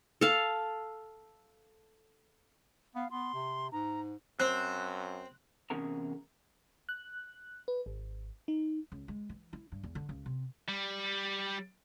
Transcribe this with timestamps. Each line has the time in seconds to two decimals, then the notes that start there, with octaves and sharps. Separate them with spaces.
0.21 A4 F5
2.95 B3 F5
3.11 B3 C6
3.34 C3
3.72 G#2 A#5
4.40 F#2 C4 C5 F#6
5.70 E2 C3 C#4 G#4 A#4 A#5
6.89 F#6
7.68 B4
7.86 G#1
8.48 D#4
8.92 C#2
9.08 G#3
9.29 E3
9.53 E4
9.72 G2
9.83 E2
9.95 D3
10.09 C#2
10.26 C3
10.68 G3